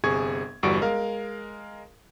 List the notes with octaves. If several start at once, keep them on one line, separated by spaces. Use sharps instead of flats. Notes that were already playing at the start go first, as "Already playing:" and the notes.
G1 C3 G#4 G#5 C#6 G#6
G1 E2 G3 F#4 C#6 D7
G#3 A#4 F5